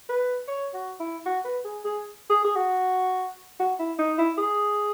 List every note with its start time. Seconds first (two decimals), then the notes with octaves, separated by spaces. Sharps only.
0.09 B4
0.48 C#5
0.74 F#4
1.00 E4
1.26 F#4
1.45 B4
1.65 G#4
1.84 G#4
2.30 G#4
2.45 G#4
2.56 F#4
3.60 F#4
3.79 E4
3.99 D#4
4.18 E4
4.38 G#4